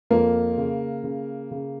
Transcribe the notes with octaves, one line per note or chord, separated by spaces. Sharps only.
F2 A#3 A#4
C#3
C#3
C#3